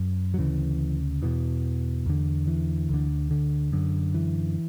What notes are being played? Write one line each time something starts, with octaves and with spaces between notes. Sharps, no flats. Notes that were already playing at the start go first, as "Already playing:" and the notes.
Already playing: F#2
F#3
D2 C#3 E3
E2 B2 E3
E2 D3
E3
D2 D3
D3
F#2 D3
E3